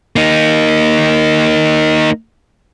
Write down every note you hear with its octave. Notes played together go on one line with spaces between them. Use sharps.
A#3 D#4